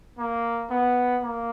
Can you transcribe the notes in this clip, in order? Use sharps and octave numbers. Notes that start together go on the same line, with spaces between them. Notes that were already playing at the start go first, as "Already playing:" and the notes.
A#3
B3
A#3